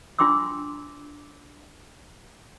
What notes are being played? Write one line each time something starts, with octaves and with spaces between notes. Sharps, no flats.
D4 F4 G5 C6 D6 E6